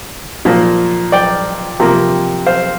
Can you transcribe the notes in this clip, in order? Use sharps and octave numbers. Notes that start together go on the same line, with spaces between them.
A#2 F3 A#3
D5 G5
C3 F3 A#3
C5 F5